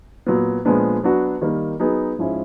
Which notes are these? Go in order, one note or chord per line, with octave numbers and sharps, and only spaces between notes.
A#2 F#3 B3
A#2 F3 G#3 B3 D4
F#3 B3 D4 F#4
D#3 G3 A#3
F#3 B3 D#4 G#4
G#2 F3 G#3 C#4 E4